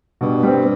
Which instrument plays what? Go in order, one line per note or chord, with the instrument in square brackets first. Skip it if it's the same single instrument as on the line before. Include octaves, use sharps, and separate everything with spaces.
[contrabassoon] G2 [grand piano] B2
[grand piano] G3 C4